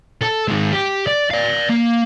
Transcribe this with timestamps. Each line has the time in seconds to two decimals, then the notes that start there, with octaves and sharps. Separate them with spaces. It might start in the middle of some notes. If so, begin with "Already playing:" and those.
0.22 A4
0.48 D#3 G#3
0.72 G4
1.07 D5
1.31 D5 F5
1.70 A#3